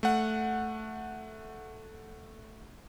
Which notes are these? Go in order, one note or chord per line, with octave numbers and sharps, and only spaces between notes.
A3 F#5